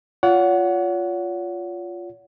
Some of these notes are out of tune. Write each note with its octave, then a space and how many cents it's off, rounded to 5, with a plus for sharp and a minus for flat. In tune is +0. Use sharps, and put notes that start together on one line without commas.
F4 +0 C#5 +40 F#5 +0